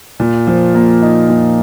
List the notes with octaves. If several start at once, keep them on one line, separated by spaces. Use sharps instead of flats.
A#2
F3
A#3
D#4
A#2